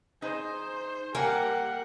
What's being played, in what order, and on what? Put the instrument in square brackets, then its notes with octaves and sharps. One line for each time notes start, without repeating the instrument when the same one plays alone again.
[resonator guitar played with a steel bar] D#4 G#4 [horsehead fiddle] C5
[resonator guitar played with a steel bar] G3 A#4 G#5 [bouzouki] A#3 [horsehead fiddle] G4 F#5